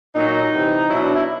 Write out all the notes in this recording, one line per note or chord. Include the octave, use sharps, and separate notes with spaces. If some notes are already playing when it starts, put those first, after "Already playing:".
A#2 F#3 D#4
C3 E3
B2 F#3 E4
D4
E4